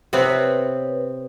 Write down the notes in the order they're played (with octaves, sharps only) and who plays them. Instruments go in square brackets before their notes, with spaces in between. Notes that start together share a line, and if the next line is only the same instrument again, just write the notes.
[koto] C3 B3 C4 [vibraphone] B4 C#5